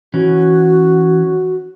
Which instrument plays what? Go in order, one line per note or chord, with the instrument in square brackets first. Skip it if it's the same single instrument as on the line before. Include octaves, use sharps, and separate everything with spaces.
[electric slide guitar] E3 C#4 [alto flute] F#4